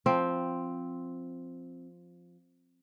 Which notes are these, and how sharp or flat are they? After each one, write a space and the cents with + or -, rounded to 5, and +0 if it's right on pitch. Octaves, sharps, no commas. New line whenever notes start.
F3 +0 C4 +0